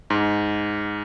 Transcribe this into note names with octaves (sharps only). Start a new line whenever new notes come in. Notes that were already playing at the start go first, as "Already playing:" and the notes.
G#2